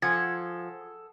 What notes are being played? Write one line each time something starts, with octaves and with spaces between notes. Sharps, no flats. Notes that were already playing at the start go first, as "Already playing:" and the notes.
F3 G#4 A4 F#5 G#6